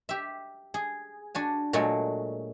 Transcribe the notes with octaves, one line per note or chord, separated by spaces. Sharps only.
G4 E5
G#4
D4 F#4 G#5
A#2 F#3 G#3 A3 F#4